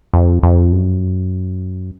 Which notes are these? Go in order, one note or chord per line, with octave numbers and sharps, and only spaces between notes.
F2
F2
F#2